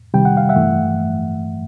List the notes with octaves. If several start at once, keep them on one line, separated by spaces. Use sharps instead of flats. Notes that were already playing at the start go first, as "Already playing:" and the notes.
C3 D#3 G3 G5
F#5
F5
E5 F#5
G2 E3 A3